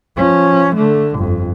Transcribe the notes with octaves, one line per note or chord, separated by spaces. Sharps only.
F3 C#4
D3 A3
G1 F2